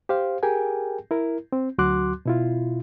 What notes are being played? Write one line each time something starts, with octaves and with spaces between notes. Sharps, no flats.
G4 C5 F5
G4 G#4 A#4 G5 G#5
E4 A#4
C4
D2 F#3 F#4 C6 D6 F#6
B2 E4 F4